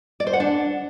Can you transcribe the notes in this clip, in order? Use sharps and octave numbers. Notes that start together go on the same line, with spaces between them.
D5
C5
F#5
D4